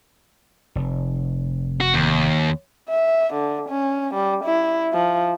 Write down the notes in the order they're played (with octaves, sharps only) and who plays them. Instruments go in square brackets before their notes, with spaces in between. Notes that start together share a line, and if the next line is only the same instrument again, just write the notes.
[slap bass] F1
[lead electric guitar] F#4
D#2
[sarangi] E5
D3
C#4
G3
E4
F3